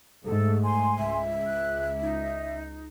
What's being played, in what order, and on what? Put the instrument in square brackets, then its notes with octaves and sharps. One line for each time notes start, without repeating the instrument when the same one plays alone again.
[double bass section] G#2 A3 [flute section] A4
[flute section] G#5 C6
[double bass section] C#2 [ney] E5
[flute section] F#6
D#4